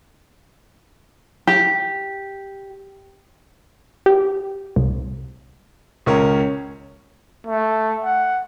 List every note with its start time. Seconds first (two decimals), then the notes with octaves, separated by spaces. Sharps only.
1.47 G4
4.06 G4
4.76 C2
6.06 C#2 C#4 A#4
7.47 A3
8.04 F#5